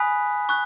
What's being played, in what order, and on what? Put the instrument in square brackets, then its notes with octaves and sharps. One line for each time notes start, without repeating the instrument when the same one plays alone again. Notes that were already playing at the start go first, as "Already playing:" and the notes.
Already playing: [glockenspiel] G#5 B5 D#6 F#6 B6
C#6 F#6